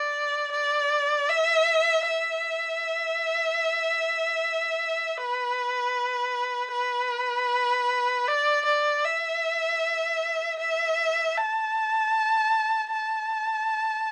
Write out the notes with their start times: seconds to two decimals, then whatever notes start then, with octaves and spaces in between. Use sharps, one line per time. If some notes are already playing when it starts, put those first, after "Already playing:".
Already playing: D5
0.52 D5
1.29 E5
2.07 E5
5.17 B4
6.73 B4
8.28 D5
8.66 D5
9.05 E5
10.59 E5
11.37 A5
12.92 A5